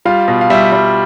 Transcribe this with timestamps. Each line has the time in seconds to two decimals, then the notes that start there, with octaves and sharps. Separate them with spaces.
0.05 G3 F4 F5
0.28 B2
0.41 F5
0.50 G3 E5
0.72 G3